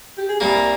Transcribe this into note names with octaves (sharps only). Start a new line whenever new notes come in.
G4
G#4
C2 A#2 G3 A#3 A#4